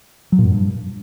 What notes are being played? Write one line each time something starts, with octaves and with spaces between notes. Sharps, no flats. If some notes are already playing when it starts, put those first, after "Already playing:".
F#3
A#2
F#2
G2